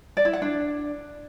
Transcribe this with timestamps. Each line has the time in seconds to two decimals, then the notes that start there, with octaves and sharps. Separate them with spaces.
0.17 D5
0.25 E4
0.33 F#5
0.42 D4